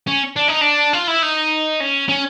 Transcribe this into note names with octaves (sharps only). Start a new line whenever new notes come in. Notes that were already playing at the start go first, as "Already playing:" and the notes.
C#4
D4
D#4
D4
F4
E4
D#4
C#4
C#4